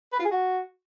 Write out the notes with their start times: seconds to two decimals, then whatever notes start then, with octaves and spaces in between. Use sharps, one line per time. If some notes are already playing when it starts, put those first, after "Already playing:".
0.13 B4
0.19 F4
0.25 G#4
0.31 F#4